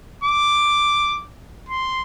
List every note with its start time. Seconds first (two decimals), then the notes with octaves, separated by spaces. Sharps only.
0.24 D6
1.69 C6